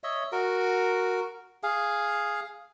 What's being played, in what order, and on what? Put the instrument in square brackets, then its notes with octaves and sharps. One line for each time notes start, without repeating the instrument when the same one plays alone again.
[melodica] C#5 D#5 E5
F#4 A#4
G#4 F5